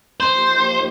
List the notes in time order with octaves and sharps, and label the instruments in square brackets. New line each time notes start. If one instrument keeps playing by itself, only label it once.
[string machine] F3 A#3 D#4 G4 [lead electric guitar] C5